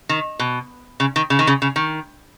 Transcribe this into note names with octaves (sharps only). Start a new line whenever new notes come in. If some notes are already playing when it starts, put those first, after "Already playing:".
D#3
B2
C#3
D#3
C#3
D#3
C#3
C#3
D#3